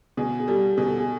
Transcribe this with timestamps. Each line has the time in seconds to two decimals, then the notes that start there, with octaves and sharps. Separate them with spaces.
0.17 B2 G#4
0.40 G#4
0.48 G3 A4
0.77 B2 G#4
0.88 A4
0.98 G#4